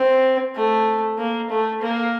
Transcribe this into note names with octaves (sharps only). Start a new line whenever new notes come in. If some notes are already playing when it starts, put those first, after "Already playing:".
Already playing: C4
A3
A#3
A3
A#3